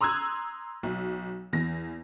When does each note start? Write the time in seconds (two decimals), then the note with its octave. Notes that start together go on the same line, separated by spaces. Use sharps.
0.01 A#5 C6 D#6 E6 F#6 G#6
0.83 B1
1.53 E2 A#6